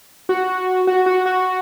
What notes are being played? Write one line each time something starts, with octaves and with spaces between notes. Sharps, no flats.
F#4
F#4
F#4
F#4